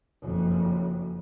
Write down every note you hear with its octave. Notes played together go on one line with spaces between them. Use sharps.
F#1 F2